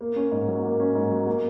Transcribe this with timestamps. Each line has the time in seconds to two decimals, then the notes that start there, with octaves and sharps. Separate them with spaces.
0.01 A#3
0.16 C#4
0.31 G#2
0.48 F#3
0.63 A#3
0.80 C#4
0.95 G#2
1.11 F#3
1.27 A#3